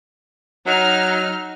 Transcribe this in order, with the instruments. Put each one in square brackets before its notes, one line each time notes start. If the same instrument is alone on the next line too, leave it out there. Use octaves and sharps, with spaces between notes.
[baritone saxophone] F#3 [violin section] D#4 F6